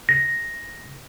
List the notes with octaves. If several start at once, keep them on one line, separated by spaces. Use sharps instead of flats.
A#6